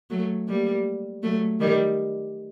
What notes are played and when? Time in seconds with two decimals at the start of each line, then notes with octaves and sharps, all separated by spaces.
0.10 F#3 A3
0.48 G3 A#3
1.23 F#3 A3
1.60 D#3 G3